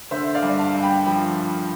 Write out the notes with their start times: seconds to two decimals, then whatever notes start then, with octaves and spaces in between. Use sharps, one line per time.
0.11 D3 C5 E5
0.35 D5 F5
0.43 G2
0.59 F5 A5
0.74 G2
0.82 G5 B5
1.06 F3 G5 B5